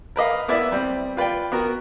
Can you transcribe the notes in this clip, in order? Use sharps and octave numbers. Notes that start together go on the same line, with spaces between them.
A#4 B4 D#5 F5
A#3 B3 E4 B4 D5 E5
G3 C4
F4 B4 D5 G5
B3 F#4 A#4